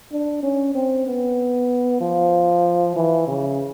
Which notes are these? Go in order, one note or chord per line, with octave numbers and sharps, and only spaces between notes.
D4
C#4
C4
B3
F3
E3
C#3